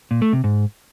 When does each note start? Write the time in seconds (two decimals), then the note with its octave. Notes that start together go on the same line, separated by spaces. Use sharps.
0.11 A#2
0.22 A3
0.33 C3
0.44 G#2